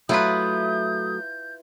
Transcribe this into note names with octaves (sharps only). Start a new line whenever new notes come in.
F#3 A3 E4 F4 B4 D#6 G6